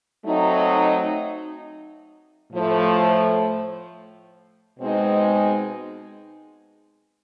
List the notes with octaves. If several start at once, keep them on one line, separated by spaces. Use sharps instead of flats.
F#3 A3 C4 D#4
A2 F3 A3
B2 G#3 C4 D#4